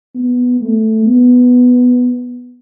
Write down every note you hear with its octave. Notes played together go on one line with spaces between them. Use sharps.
B3
A3
B3